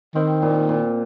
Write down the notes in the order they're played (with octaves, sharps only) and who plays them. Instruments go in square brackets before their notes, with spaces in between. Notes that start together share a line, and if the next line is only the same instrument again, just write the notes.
[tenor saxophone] D#3 [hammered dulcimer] C4
[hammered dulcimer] A#2
A#2